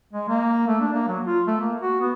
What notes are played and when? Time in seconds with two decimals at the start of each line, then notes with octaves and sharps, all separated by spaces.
0.13 G#3
0.29 A#3
0.68 A3
0.81 D4
0.93 A#3
1.08 F#3
1.26 F4
1.47 A3
1.60 A#3
1.82 F#4
2.01 B3